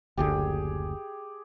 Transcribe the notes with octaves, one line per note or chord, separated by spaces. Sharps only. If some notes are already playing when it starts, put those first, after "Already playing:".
F#1 D2 D3 G4 G#4